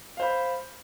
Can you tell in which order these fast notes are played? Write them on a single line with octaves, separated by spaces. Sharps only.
F5 C5 B5